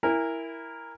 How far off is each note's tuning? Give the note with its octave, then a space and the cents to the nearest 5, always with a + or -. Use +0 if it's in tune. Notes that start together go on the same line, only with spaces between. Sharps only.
E4 +0 A#4 +0 G#5 -30